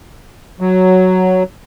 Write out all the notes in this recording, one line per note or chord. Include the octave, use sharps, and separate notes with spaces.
F#3